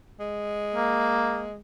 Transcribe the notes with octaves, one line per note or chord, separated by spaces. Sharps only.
G#3
A#3